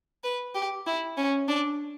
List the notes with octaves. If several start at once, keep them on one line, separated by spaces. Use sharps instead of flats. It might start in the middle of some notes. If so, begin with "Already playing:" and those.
B4
G4
E4
C#4
D4